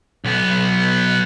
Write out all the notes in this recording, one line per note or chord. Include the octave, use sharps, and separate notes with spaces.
B1 B3